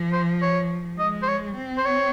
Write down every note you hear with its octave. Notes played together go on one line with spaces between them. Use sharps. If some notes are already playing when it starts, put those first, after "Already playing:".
Already playing: F3
C5
C#5
G#3 D#5
C5
C#5
C4
C5
C#5